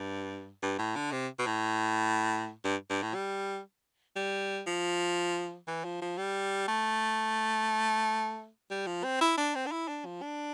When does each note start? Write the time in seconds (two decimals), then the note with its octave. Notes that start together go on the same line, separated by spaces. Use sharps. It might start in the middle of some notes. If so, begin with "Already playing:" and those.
Already playing: G2
0.63 G2
0.78 A2
0.96 D3
1.12 C3
1.39 B2
1.46 A2
2.64 G2
2.90 G2
3.02 A2
3.15 G3
4.16 G3
4.67 F3
5.68 E3
5.85 F3
6.02 F3
6.18 G3
6.68 A3
8.71 G3
8.87 F3
9.04 C4
9.21 E4
9.38 D4
9.55 C4
9.67 D4
9.72 E4
9.88 D4
10.05 F3
10.22 D4